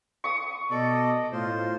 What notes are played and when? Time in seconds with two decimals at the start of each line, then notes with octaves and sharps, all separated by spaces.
0.24 C#6 D#6
0.71 B2 A4 D5 D#5
1.32 A2 F4 C5